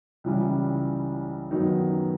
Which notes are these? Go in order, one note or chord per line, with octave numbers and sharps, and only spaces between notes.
C#2 C#3 E3 G3
F#2 D#3 F#3 B3 D#4